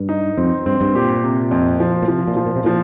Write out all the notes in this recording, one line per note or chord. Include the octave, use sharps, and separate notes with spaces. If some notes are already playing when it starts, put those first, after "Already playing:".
Already playing: G2
D#4
F2 C4
G2 C4
G2
A#2 G4
C3
F2
F3
A#2
C3 F3
A#2
F3
A#2
C3
A#2 F3